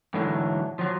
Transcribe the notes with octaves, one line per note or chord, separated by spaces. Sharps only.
G#2 D3 E3 F#3 A3
F3 F#3